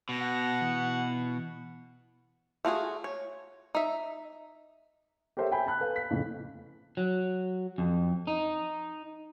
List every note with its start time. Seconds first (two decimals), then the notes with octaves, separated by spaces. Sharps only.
0.09 B2 A#6
0.21 F#5
0.61 E3
2.65 A3 F4 F#4 G#4
3.04 C#5
3.75 D#4 E5
5.37 G4 A4 A#4 C5 C#5 E5
5.51 E5 G5 G#5 B5 G6
5.66 G#5 A5 B5 F#6
5.80 A4 B4 F5
5.96 B6
6.10 F2 A2 C#3
6.97 F#3
7.78 F2
8.27 D#4